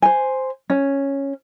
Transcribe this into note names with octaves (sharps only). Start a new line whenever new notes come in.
C5 G#5
C#4